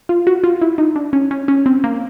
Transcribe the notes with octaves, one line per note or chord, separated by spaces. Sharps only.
F4
F#4
F4
E4
D#4
D4
C#4
C#4
C#4
C4
A#3